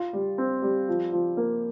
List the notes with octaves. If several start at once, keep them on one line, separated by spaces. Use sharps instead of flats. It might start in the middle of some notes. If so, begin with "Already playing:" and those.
Already playing: F4
G3
C4
G3
F3
F3
A#3